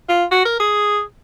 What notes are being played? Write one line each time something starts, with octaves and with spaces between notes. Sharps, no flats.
F4
F#4
A#4
G#4